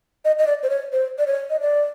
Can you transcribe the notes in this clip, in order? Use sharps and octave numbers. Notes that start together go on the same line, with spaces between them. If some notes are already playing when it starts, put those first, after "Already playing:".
D#5
D#5
D5
C5
C#5
C5
D5
C#5
D#5
D5